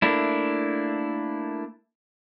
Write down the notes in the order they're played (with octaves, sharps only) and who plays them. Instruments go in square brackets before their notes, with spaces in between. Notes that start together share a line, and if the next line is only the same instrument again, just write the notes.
[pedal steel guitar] A3 A#3 D4 E4